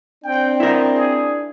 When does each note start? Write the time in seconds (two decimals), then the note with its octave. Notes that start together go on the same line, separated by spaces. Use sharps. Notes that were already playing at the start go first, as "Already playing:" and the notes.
0.24 C4 D4 G5
0.60 D#4 E4 A#4
0.93 G#4